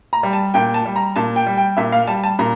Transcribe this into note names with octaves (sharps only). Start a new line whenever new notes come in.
A#5
G3
A5
A#2 G5
A5
G3
A#5
A#2 A5
G5
G3
G5
A#2 E5
F5
G3 A5
A5
A#2 A#5